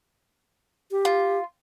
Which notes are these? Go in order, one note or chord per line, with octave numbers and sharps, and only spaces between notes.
G4
F4